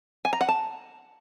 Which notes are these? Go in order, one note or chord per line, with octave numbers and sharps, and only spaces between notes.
G#5
A#5
F#5
A5